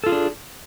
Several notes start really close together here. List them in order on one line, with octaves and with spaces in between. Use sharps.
A4 F4 G#4 D4